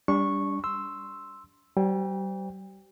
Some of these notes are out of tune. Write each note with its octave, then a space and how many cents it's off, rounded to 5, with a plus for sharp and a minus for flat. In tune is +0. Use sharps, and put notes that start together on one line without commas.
G3 +20 D4 -30 C#6 -10
C6 +0 E6 +0
G3 -35 C5 -30 G5 +35